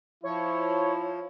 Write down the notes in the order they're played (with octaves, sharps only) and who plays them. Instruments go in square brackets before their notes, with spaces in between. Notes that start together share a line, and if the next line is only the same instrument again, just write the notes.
[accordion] F3 [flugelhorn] E4 [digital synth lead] C#5